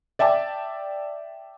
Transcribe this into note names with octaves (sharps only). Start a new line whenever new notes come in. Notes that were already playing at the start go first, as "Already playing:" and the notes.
D5 E5 G5 A5 D6